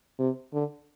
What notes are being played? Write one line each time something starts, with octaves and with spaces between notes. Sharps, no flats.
C3
D3